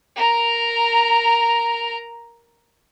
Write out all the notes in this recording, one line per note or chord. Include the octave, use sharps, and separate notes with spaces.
A#4 A#5